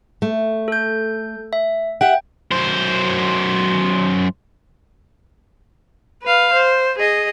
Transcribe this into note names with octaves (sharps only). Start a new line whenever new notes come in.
A3
A4 G6
E5
G4 E5 F#5 G5
F#2 C5
B4 F5
C5
G#4 D#5